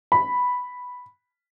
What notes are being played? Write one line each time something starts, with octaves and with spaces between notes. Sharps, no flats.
B5